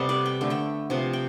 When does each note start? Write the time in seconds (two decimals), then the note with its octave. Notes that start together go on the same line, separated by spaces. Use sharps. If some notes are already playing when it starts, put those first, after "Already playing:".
Already playing: C3 G3 B3 A4
0.09 B4 D5
0.26 G5
0.41 D3 A3
0.50 E5 G5
0.90 C3 F3 B3
1.13 G5